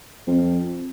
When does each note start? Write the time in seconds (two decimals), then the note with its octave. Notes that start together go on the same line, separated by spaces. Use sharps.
0.27 F2